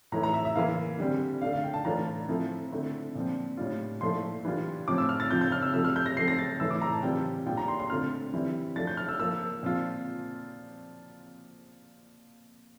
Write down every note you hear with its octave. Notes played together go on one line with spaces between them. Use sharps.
A2 E3 A3 E4 A#5
A#5
E5
E5
E3 A#3 E4 F5
D3 G3 C4
D3 A3 D4 F5
F5
G5
A5
A2 E3 A3 D4 F4 A#5
F3 A3 C4 E4
D3 A3 C4 E4
A#2 F3 C4
A2 G3 D4 F4
A#2 F3 A3 E4 C6
E3 G3 D4 F4
A2 F3 C4 F4 D6
E6
F6
A6
F3 C4 F4 G6
G6
F6
E6
C3 F3 A3 E6
F6
G6
A#6
F3 A3 C4 C7
A#6
A6
A2 E3 A3 E4 E6
D6
A#5
A5
E3 G3 C4 F4 G5
A#2 G3 D4 F4 G5
A#5
C6
C6
D3 A3 C4 F4 F6
E3 G3 C4 E4
F3 A3 D4 F4 A6
G6
F6
E6
F3 A#3 F4 E6
A#2 F3 C4 F4